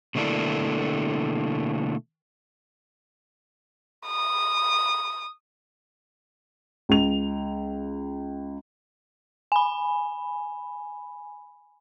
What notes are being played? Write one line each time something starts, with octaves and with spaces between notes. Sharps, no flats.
B2 D3 A3 A#3 D4 E4
D#6
C#2 F7
G#5 B5